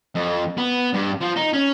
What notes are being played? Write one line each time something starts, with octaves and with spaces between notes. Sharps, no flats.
F2
B3
G2
F3
D#4
C#4